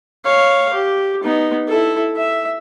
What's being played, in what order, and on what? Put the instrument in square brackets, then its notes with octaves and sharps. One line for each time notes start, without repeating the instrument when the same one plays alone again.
[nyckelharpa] C#5 F5
G4
B3 D#4
E4 A4
E5